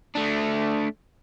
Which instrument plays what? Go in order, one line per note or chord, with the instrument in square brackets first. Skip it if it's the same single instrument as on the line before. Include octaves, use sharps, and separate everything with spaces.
[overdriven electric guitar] A3 D4